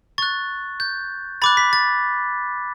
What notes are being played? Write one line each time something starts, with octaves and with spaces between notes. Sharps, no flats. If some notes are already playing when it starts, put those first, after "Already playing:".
C#6 F#6 A6
G6
B5 D6 F#6 A6
B6
A6